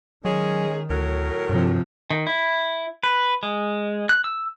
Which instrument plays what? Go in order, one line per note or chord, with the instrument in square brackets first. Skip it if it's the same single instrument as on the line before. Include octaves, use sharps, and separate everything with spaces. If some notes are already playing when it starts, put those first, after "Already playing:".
[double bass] D#3 [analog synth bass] F#3 [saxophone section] G#3 C#4 G#4
[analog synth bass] D2 [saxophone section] A2 F#3 A#4
[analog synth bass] G2 [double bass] C3 F3
[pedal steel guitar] D#3
E4
B4
G#3
F#6
E6